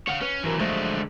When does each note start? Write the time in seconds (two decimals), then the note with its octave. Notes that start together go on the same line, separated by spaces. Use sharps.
0.07 C#5 F5 F#5
0.21 C#4 B4
0.44 E3 F#3 C4 A#4
0.59 D3 F3 F#3 G#3 A3